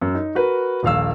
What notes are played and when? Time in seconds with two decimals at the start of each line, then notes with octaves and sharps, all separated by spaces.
0.01 F#2
0.15 D#4
0.35 F#4 A#4 B4
0.83 D#1 A#1 F5 E6